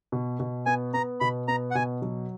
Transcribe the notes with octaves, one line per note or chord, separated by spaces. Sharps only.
B2
B2
B3 G#5
B3 A#5
B2 B5
B3 A#5
F#5
B2 G#5
F#3